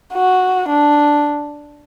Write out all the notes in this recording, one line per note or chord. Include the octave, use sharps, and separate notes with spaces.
F#4
D4